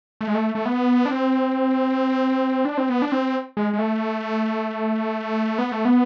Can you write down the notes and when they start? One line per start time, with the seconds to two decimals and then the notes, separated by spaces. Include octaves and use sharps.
0.21 A3
0.27 G#3
0.35 A3
0.55 A3
0.65 B3
1.06 D4
1.10 C4
2.65 D4
2.78 C4
2.89 B3
3.02 D4
3.12 C4
3.57 G#3
3.73 G#3
3.79 A3
5.58 B3
5.72 A3
5.85 B3